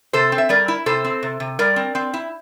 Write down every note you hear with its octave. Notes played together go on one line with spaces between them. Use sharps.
C3 A4 C5
C4
E5
G3 A#4 D5
E4
C3 A4 C5
C4
C3
C3
G3 A#4 D5
C4
C4
E4